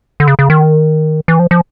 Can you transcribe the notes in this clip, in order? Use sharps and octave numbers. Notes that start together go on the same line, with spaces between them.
D3
C#3
C#3
D#3
E3
F3
F3